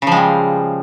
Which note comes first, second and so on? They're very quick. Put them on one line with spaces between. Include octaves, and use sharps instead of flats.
C#3 F3 G#3 G3